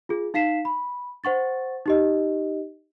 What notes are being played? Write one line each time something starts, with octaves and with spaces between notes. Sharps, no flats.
F4 G#4
D#4 F5 B6 C7 E7
B5
C5 F#5 C#6 A6
D#4 G4 D#5